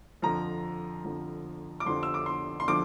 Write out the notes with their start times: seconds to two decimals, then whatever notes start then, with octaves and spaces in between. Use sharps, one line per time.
0.22 F2 D3 F3 A#5
1.04 F2 D3 F3
1.80 D6
1.86 F2 D3 F3 C6
2.03 E6
2.14 D6
2.26 C6
2.60 C6
2.68 D3 F3 D6